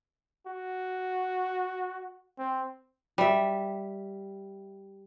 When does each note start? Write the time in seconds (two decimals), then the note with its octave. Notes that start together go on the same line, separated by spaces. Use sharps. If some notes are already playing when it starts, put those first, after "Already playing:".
0.47 F#4
2.39 C4
3.18 G3 E5